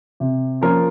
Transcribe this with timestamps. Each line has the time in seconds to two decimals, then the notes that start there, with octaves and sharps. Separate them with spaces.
0.20 C3
0.61 F3 A#3 C#4 F4 A#4